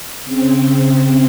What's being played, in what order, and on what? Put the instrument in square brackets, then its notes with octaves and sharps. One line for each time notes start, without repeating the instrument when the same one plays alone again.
[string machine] C#3 C4